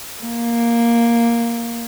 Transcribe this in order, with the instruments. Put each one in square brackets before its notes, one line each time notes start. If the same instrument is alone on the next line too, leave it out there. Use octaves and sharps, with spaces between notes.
[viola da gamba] A#3